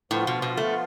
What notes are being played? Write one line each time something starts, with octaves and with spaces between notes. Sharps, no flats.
A2 F3 B3 F4
B2
B2
A3